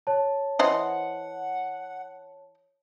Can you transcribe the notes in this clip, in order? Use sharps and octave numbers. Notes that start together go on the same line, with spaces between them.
C#5 A5
E3 C5 D#5 F#5